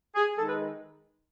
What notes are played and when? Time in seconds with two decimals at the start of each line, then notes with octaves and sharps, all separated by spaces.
0.15 G#4
0.37 D#3 G#3 D#4 A4
0.47 B4